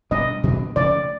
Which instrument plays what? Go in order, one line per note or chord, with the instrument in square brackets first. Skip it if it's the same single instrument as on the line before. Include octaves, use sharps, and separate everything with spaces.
[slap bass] B2 G3 B3 D4 [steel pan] D#5
[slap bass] B2 F#3 B3 D4
[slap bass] C#3 F3 A3 [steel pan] D5